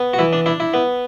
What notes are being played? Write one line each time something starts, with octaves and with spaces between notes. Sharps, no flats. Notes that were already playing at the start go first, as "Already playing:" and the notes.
Already playing: B3
F#4
E3 E4
D4
D4 E4
E4
B3